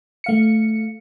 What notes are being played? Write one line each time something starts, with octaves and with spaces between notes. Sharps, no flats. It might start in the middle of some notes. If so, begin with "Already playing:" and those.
A3 F5 C#7